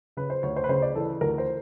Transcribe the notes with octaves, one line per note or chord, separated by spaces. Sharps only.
C#3 B4
C5
D2 C#5
C5
B4
C#3 C5
D5
E3 A4
D2 A#4
C5